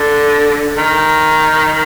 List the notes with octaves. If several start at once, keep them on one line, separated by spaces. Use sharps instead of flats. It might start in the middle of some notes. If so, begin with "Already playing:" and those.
Already playing: D3
D#3